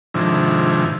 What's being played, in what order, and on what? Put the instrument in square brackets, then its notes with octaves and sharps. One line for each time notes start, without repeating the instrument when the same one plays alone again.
[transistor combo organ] G#2 C3 D#3 F3 D4 E4